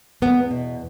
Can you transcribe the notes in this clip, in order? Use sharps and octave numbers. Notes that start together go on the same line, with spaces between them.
E2 B3
B2